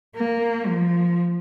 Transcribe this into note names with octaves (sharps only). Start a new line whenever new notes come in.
A#3
F3